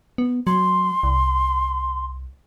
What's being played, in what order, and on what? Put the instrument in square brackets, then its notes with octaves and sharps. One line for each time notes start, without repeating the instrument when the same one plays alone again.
[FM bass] B3
[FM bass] F#3 [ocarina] C6
[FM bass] C2